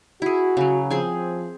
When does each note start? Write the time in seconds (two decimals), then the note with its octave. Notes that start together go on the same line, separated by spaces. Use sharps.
0.22 E4 F#4 G#4
0.57 C#3 F#3
0.90 F3 C4 G#4 G#5